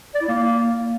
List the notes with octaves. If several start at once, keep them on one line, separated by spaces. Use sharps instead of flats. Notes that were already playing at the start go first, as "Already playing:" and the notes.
D5
E4
A#3